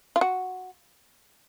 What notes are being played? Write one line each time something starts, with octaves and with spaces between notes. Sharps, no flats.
F4
F#4